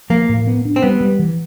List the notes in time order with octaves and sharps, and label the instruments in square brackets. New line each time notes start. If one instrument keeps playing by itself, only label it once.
[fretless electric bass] F3 [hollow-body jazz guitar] A#3
[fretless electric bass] A2
B3
D4
[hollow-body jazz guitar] C4
[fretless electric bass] G3 [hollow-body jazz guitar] B3
[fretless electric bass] G3
E3